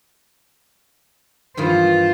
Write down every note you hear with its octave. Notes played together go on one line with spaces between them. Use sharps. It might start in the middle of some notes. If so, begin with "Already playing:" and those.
G2 D#3 E3 F4 C5